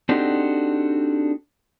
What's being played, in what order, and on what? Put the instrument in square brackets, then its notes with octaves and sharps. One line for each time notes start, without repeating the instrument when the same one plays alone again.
[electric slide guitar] C4 D4 D#4 F#4 G4 A4